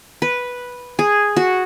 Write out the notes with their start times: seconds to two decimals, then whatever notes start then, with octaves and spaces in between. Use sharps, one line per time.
0.22 B4
0.99 G#4
1.37 F#4